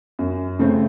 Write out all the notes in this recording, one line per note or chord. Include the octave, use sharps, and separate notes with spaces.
F#2
C#3 A3 C4